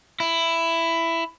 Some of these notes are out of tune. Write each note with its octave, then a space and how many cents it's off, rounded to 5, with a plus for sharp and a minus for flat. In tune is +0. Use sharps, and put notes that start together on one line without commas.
E4 +10